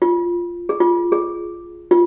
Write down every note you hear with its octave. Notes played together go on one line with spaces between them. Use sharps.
F4
G#4
F4
G#4
F4